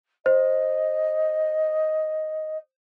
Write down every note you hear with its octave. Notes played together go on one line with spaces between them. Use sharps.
C5 D#5